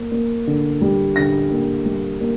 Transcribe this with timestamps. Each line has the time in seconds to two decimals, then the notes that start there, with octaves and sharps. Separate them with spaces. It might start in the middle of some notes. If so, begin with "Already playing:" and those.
Already playing: A#3
0.12 A#3
0.47 D3
0.81 G3
1.16 D3 A#6
1.52 A#3
1.85 G3
2.21 A#3